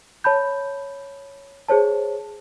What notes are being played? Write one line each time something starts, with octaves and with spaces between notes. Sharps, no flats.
C#5 A5 B5 G6
G#4 C5 C#5 A5